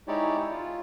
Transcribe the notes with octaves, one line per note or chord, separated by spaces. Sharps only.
G#3 D#4 E4 G4 C#5 D5
E4
F4